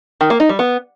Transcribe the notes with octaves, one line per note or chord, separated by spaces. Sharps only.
D#3
A#3
D#4
G3
B3